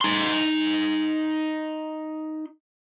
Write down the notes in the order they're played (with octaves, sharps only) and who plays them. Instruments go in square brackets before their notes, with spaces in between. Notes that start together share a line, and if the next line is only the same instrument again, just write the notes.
[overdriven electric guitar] D#4 C6